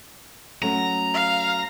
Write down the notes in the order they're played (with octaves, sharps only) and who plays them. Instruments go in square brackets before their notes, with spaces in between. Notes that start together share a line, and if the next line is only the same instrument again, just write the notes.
[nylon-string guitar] F#3 A3 C#4 [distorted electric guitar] A#5
[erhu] F5